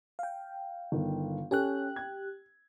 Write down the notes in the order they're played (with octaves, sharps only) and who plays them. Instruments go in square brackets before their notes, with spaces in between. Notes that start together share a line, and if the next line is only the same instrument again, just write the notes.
[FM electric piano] F5 G5
[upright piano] G1 D#3
[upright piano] C#4 A4 G#5 [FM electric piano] G4 G5 F#6
[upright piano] G#6